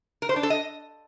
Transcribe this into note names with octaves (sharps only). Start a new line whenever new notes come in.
A#4
C5
D4
A4
D#5